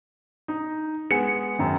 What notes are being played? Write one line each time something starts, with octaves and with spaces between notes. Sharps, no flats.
D#4
G#3 B3 G#5 C#7
F#2 D#3